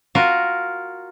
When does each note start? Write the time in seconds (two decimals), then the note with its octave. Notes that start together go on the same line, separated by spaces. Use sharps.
0.15 F4 F#4 A#4